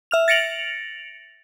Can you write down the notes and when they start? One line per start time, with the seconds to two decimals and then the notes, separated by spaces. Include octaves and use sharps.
0.11 E5 F6 F7
0.28 A6 A#6 C#7 D7 F7 F#7